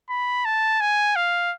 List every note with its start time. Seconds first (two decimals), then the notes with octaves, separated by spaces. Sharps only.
0.10 B5
0.45 A5
0.81 G#5
1.16 F5